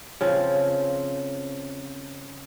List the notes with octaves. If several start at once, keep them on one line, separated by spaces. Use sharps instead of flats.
C#3 F3 C4